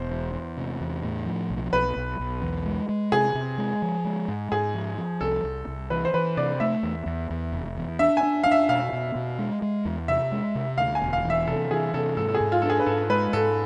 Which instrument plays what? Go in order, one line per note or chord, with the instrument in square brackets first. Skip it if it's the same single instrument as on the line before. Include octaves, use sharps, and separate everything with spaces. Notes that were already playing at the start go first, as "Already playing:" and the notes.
Already playing: [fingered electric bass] E1 [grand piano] C5
[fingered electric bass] E2
E2
C3
E2
A2
F3
B1
[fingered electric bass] B1 [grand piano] B4
[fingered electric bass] B1
B1
E2
G#3
G#3
[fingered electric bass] C3 [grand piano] G#4
[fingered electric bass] C3
G#3
F3
G#3
G#2
[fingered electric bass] G#2 [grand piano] G#4
[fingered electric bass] F3
F3
[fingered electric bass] C2 [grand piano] A4
[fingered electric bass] C2
C2
[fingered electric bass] E3 [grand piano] B4
[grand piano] C5
[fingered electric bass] E3 [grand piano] B4
[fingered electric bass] C3 [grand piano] D5
[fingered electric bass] A3 [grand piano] E5
[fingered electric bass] E2
E2
E2
F1
E2
[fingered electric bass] D4 [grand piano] E5
[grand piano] G#5
[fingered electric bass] D4
[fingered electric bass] D4 [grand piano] F5
[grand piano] E5
[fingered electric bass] B2 [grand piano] F5
[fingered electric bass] B2
B2
G#3
G#3
E2
[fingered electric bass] C3 [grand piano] E5
[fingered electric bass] G#3
C3
[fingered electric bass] D2 [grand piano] F5
[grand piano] G#5
[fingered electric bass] E1
[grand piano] F5
[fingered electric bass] E3
[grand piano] E5
[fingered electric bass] C3 [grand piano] A4
[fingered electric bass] E3 [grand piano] G#4
[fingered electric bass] C3 [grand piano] A4
[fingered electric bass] G#2 [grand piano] A4
[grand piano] A4
G#4
[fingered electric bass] G#2
[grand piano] F4
[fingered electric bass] D4 [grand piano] A4
[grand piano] G#4
B4
[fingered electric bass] G#2 [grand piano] A4
[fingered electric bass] G#3 [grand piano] B4
[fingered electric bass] G#2 [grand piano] A4